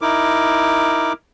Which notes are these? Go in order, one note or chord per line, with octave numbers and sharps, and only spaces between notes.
D#4 E4 A#4 D6